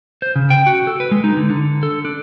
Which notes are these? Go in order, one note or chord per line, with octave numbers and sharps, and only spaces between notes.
C5
C#3
G5
F#4
A4
B4
G#3
D#4
D3
D3
A4
D4